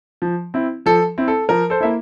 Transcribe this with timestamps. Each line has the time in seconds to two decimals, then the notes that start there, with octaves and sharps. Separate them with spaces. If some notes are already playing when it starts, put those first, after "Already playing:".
0.22 F3
0.54 C4 E4
0.86 F3 A4
1.18 C4 E4
1.28 A4
1.49 F3 A#4
1.70 A4 C5
1.81 A#3 E4 E5